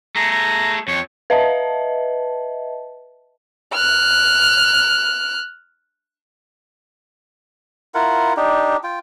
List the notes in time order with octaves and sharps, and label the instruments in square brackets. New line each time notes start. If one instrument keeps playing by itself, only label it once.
[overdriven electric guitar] A3 G#4 [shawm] A#5
[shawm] A#5
[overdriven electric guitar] F2 [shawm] C#5
[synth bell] B4 D#5 E5 A5
[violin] F6 F#6
[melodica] E4 F4 A#4 F#5
D4 D#4 G4
F4 G5